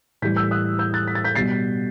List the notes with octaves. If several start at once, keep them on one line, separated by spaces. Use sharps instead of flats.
A2 E3 G3 G6 B6
E6 G6
D#6 F#6
E6 G6
F#6 A6
B6
A6
G6 B6
B2 G3 A6 C7